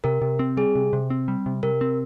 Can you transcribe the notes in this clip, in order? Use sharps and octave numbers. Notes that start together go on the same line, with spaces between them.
C3 A#4
C3
C4
G3 G#4
C3
C3
C4
G3
C3
C3 A#4
C4